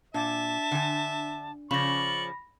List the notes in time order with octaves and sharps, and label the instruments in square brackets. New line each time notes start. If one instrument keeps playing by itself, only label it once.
[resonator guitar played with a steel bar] A#2 [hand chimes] D4 [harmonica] E5 [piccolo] A5
[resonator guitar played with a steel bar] D3 G#5
[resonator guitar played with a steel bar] C#3 F3 C#4 [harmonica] D5 C#6 [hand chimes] B5 A#6 [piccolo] F#7